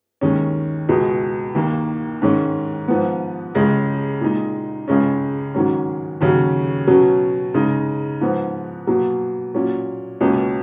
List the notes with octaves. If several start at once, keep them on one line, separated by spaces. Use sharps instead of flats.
D#2 D#3 G#3 C#4
C#2 B2 G#3
D#2 D#3 A#3
G#2 D#3 G#3 C#4
G#2 F3 B3
C#2 C#3 G#3 C#4
A#2 G#3 D#4
C#2 C#3 G#3 C#4
G#2 D#3 F#3 C#4
D#2 C#3 F#3 C#4
B2 F#3 C#4
C#3 G#3 D#4
G#2 F3 B3
B2 F#3 A#3
A#2 F#3 C#4
C#2 B2 A#3 C#4